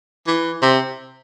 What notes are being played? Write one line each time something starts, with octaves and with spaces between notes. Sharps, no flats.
E3
C3